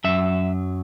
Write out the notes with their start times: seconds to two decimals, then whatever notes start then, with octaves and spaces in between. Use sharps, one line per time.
0.04 F#2 F#3 E5